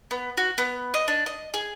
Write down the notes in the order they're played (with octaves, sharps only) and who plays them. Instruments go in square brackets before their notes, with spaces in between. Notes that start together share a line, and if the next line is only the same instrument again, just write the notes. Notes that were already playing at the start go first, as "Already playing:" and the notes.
[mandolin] B3
F#4
B3
D#5
D4
D#5
G#4